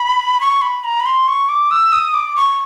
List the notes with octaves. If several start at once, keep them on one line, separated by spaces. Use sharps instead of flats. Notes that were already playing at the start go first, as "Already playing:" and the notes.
Already playing: B5
C#6
B5
A#5
B5
C6
C#6
D6
E6
D#6
D6
C#6